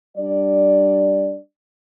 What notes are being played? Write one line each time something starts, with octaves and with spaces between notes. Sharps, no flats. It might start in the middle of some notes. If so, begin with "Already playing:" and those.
G3 D4 D5